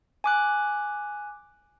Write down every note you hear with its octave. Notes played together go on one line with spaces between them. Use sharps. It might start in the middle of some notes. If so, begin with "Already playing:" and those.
G#5 D6 F#6